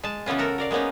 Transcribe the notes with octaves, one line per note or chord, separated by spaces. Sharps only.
G#3 A5
C#3 E3 B3 C#4 F4
F#4 A4 A#4
A#4 D5 F5
G#3 A#3 B3 C#4 D#4